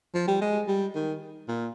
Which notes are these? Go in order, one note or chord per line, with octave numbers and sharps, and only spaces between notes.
F3
G3
G#3
G3
D#3
A#2